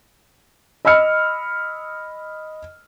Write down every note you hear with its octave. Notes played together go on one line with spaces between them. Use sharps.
D#5 B5 E6 F6 C#7